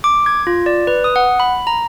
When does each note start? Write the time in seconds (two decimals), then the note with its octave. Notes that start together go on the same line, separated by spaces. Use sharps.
0.04 D6
0.26 G#6
0.47 F4
0.66 D5
0.87 B4
1.04 D#6
1.16 F#5
1.40 B5
1.67 A#5